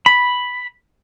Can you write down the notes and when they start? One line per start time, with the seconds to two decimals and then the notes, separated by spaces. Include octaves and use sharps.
0.06 B5